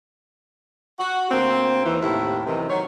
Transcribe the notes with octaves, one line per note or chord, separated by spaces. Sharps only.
F#4
D2 A#3 C4
D#2 E3
D#2 A2 C3 E4
F#2 C3 D#3 E3
D#3 F#3 C#5